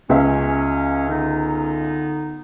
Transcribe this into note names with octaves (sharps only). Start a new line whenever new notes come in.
C#2 C#4 E5 F5
D3 B3 D#4